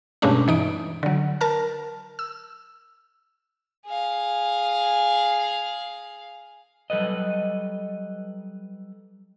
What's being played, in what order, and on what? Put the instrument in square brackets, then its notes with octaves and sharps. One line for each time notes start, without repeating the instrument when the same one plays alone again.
[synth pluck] G2 B2 G#3 A3 C#4 D4
E3 D#4 D7
D3 F#3
A#4 A5 F6
E6
[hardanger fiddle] G#4 F5
[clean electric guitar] F#3 G3 A4 B4 D#5